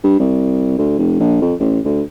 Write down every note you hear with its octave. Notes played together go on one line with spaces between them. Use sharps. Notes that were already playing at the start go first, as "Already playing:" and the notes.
G2
C2
D2
F1
A#1
F2
A1
D2